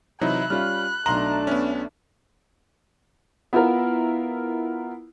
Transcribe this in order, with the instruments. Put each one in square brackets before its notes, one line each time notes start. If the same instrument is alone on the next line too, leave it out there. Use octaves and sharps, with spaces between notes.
[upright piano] C3 E3 [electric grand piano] F#3 D#4 [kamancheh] E5 B5 [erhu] F#6
[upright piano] G3 C#4 F4 [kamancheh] B5 [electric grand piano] F6
[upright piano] B1 C6 F#7 [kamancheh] A3 D4 [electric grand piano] A#5
[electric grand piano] B3 C#4
[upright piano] B3 E4 F4 A#4